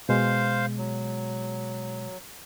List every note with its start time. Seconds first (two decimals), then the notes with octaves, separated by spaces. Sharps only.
0.09 B2 G#3 C5 F5
0.78 F#3